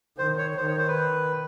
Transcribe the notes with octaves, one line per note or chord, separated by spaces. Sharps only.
D#3 C5
C#5
D#3 C5
C#5
C5
B4